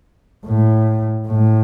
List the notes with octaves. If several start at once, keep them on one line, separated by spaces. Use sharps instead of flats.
A2
A2